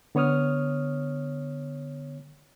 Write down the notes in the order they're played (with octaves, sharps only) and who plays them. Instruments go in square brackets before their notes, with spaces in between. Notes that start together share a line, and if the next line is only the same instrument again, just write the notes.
[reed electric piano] D3 B3 C#5 D#6 F6